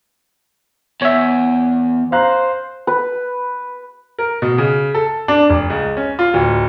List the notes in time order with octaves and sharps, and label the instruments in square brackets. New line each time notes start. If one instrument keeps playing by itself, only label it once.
[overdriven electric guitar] E2 [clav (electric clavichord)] C#5 E5
[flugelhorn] C5 [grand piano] F5 A#5 F#6
[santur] B4
[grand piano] A#4
B2
C#3
A4
D4
F1
C#2
C#4
F4
D1